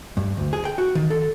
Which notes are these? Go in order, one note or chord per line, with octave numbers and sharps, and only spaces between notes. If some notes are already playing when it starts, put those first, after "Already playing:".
G2
D2
G#4
G5
F#4
D#3
A4